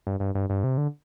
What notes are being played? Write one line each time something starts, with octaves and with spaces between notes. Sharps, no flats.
G2
G2
G2
G2
C3
D3